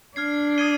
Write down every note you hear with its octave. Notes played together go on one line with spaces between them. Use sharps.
D4 F6 G#6 C7
D#6 G#6 D#7 G7